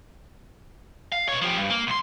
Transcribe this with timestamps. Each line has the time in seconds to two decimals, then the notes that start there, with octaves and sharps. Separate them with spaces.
1.12 F5
1.28 B2 C#5
1.41 F3 G4
1.56 G2
1.70 A#3
1.87 C2 C6